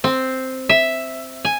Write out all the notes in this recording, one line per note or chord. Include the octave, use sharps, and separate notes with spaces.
C4
E5
G#5